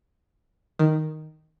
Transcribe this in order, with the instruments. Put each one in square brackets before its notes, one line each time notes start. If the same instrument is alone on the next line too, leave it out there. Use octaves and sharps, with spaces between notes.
[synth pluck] D#3